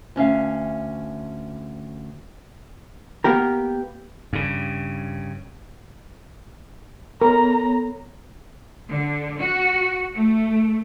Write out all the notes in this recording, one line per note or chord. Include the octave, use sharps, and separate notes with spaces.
D2 C#4 E5 F5
A#3 B3 G4 A#4
G2 C#3
B3 A4 A#4 C#5 A#5
D3
F#4
A3